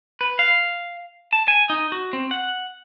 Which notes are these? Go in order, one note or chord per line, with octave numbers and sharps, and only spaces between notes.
B4
F5
A5
G#5
D#4
F#4
C4
F#5